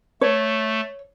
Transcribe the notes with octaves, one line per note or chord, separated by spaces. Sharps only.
A3 C#5